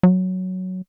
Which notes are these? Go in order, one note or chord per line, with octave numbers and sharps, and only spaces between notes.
F#3